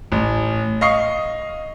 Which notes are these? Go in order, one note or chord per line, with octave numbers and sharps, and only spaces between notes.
A1
D#5 F5 C#6 C7